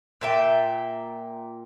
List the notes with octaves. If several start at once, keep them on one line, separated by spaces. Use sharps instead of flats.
A#2 E5 G5